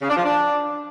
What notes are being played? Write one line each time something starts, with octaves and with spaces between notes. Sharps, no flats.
C#3
D4
F3
D4